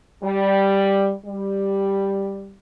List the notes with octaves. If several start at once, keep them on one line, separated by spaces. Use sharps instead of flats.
G3
G3